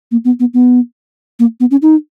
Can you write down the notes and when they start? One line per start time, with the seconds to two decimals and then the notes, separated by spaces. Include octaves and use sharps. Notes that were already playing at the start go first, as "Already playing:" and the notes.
0.11 A#3
0.25 B3
0.40 B3
0.54 B3
1.39 A#3
1.60 B3
1.71 C#4
1.82 D#4